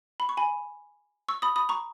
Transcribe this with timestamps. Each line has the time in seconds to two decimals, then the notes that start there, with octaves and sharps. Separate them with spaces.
0.20 B5
0.29 C#6
0.37 G#5 B5
1.28 C#6 E6
1.42 B5 D#6
1.56 B5 D#6
1.69 A#5 C#6